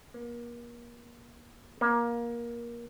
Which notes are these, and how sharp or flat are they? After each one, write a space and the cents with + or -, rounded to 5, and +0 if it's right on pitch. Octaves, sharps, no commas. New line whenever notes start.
A#3 +35
A#3 +20